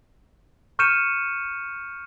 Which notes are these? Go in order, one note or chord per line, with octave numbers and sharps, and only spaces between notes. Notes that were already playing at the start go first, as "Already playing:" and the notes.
C#6 F6 G6 C#7 D#7 E7